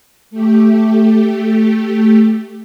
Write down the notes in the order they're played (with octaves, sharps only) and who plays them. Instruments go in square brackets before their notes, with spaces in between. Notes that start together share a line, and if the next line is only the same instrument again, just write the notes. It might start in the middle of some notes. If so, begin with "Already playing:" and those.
[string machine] A3 G4